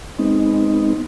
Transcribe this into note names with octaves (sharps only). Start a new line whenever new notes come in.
G#3 B3 C4 D#4